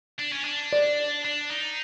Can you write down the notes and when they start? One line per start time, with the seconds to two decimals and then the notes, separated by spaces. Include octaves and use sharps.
0.19 D4
0.33 C#4
0.45 D4
0.73 D5
1.25 D4
1.51 D#4